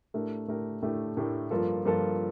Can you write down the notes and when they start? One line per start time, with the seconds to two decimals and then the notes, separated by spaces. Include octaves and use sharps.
0.14 A2 A3 D4 G4 A#4
0.48 A2 A3 D4 G4 A#4
0.82 A2 A3 D4 G4 A#4
1.17 A2 A3 D4 G4 A#4
1.51 G2 F3 A#3 F4 A4
1.85 G2 F3 A#3 F4 A4